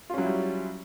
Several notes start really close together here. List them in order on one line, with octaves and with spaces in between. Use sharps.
F4 C#4 F#3 E4 G3